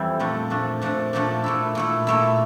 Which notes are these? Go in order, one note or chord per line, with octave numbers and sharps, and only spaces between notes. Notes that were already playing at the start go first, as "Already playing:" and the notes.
Already playing: F2 E3 G3 C4 E4
A#2 F3 A3 D4
A#2 F3 A3 D4
A#2 F3 A3 D4
A#2 F3 A3 D4
A#2 A3 E4
A#2 A3 E4
A#2 A3 E4